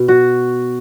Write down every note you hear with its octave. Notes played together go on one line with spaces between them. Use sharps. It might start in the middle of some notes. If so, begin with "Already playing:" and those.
Already playing: B2
F#4